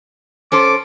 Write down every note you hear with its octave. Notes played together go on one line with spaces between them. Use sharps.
C#4 A4 C5 D6